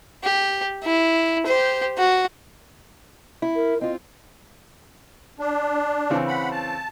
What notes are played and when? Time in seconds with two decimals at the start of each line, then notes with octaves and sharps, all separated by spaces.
0.23 G4
0.83 E4
1.46 G4 C5
1.98 F#4
3.42 E4
3.56 A#4
3.81 C4 F4 D#5
5.39 D4
6.10 C#3 E3 C4
6.28 F#5 B5
6.51 A5